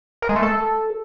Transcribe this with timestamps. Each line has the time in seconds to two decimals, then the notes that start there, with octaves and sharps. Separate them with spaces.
0.22 A#4
0.29 G#3
0.36 A3
0.43 A4